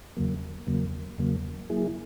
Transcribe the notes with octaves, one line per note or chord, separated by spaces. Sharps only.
E2 C#3 F#3 A#3
E2 C#3 F#3 A#3
E2 C#3 F#3 A#3
F#3 A#3 E4 G#4